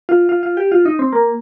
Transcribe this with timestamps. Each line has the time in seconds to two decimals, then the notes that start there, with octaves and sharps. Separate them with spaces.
0.09 F4
0.29 F4
0.43 F4
0.57 G4
0.72 F4
0.85 D#4
0.99 C4
1.13 A#3